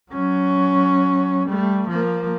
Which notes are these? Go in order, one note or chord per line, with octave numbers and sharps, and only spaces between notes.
F#3 C#4
G3 A3
F3 A#3